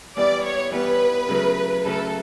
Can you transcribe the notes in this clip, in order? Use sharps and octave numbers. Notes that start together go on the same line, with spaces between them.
E3 G3 B3 D5
C#5
E3 G3 B3 B4
C#3 F#3 A3
C#3 F#3 A3 A4